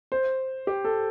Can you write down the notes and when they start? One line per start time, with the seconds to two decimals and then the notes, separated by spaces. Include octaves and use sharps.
0.12 C5
0.67 G4
0.85 A4